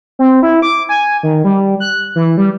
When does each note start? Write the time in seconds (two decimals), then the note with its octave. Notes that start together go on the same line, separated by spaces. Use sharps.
0.19 C4
0.42 E4
0.62 D6
0.89 G#5
1.23 D#3
1.44 G3
1.80 F#6
2.15 E3
2.37 G3